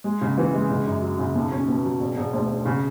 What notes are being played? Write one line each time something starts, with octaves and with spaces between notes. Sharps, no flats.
G#3
C#3
E3
G#3
C#3
F#2
F#3
C#3
B1
C#4
B2
F#3
E1
E1
D2
E1
C#3